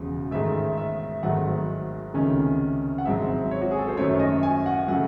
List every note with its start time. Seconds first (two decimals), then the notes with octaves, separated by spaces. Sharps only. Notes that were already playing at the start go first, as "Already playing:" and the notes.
Already playing: E1 E2 C#3
0.31 G#2 D#3 A3 E5
0.78 E5
1.23 G#1 G#2 D#3 F#3 A3 F#5
2.14 C#2 C3 D#3 A3 C#4
2.98 F#5
3.05 G#1 G#2 F#3 C4 E5
3.51 C#5
3.61 F#4
3.71 G#4
3.79 A4
3.88 C5
3.97 F#2 D#3 A3 C#4 C#5
4.19 D#5
4.43 G#5
4.66 F#5
4.88 C#3 F#3 A3 F#5